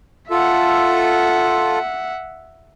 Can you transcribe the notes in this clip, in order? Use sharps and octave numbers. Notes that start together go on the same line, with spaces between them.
F4 A4 E5 F#5